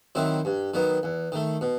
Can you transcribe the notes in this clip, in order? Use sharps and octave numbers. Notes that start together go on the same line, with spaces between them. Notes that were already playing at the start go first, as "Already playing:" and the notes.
D#3 F#3 C4 E4
G2
D#3 F#3 B3
E2
D#3 A3
B2